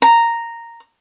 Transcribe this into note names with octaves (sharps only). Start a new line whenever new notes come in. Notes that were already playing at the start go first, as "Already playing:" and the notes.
A#5